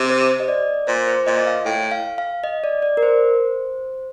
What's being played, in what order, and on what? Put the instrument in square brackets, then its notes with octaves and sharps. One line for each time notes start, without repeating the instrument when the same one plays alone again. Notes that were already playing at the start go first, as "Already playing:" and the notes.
Already playing: [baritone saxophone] C3
[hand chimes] C5
D#5
D5
[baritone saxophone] A#2 [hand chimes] C5
[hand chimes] C5
[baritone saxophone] A#2 [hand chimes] D#5
[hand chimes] F5
[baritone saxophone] A2 [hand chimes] G5
[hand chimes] F5
F5
D#5
D5
D5
A#4
C5